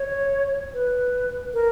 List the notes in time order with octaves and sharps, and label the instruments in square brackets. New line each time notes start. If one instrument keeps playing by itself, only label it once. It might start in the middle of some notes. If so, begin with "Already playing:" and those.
Already playing: [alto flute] C#5
B4
A#4